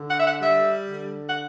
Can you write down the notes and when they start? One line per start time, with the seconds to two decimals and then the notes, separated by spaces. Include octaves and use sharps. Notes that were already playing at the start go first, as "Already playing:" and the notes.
Already playing: D3
0.08 F#5
0.16 E5
0.25 F#5
0.40 G3 E5
0.87 D3
1.28 F#5